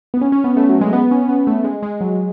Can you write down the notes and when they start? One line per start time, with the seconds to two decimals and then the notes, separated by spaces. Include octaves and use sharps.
0.14 B3
0.21 C#4
0.32 C#4
0.44 B3
0.57 A3
0.69 F#3
0.81 G#3
0.93 B3
1.11 C#4
1.22 C#4
1.29 B3
1.47 A3
1.64 G#3
1.83 G#3
2.01 F#3